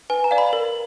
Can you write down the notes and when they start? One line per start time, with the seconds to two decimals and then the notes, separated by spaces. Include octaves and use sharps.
0.10 B4 G#5
0.24 A#5
0.31 D5 F5
0.38 B5
0.53 A#4